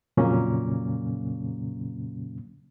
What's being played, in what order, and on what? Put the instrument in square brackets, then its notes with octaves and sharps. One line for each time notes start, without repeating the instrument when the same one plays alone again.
[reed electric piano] F2 A#2 C#3 F#3 A#3 C#4